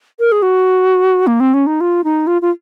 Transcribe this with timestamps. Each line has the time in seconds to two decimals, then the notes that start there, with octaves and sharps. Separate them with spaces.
0.20 A#4
0.32 G#4
0.42 F#4
1.27 A#3
1.40 C4
1.54 C#4
1.67 D#4
1.81 F4
2.04 D#4
2.27 F4
2.42 F4